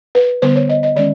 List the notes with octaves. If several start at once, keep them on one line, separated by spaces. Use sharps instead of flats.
B4
D3 G3 B3 C5
C#5
D#5
D#5
D#3 G#3 C#4 D5